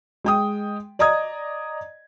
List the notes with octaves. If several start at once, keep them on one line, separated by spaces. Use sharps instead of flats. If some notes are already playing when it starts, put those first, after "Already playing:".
G#3 G5 D#6
D5 D#5 A#5 D#6 G#6